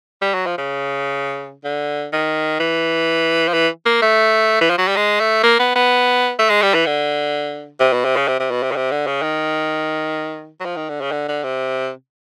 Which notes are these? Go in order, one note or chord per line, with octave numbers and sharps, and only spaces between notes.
G3
F#3
F3
C#3
D3
D#3
E3
F3
E3
A#3
A3
E3
F3
F#3
G3
G#3
A3
A#3
B3
B3
A3
G#3
G3
E3
D3
C3
B2
C3
C#3
C3
C3
B2
C3
C#3
C3
D3
C#3
D#3
F#3
F3
D#3
D3
C#3
D3
D3
C3